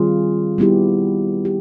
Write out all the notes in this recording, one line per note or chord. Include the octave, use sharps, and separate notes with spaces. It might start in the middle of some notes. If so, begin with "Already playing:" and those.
Already playing: D#3 G3 C4 F4 G#4
G3 B3 E4 G4
G4